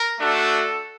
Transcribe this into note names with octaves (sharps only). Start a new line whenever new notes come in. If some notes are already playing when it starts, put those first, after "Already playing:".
Already playing: A#4
A3 D4 F#4 A4